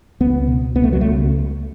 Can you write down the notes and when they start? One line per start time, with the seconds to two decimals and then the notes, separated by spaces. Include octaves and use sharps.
0.20 C#2 B3
0.47 B2
0.75 C#2 B3
0.84 A3
0.93 F#3
1.01 C#2 A3